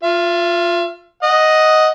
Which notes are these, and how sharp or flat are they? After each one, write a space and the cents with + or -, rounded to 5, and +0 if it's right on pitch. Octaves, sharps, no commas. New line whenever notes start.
F4 +10 E5 +45
D#5 +5 F#5 +0